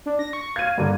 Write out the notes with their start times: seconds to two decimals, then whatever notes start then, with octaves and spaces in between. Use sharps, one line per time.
0.06 D4
0.19 A#6
0.33 C#6
0.56 F5 G#6 D#7
0.78 G2 D3 A#3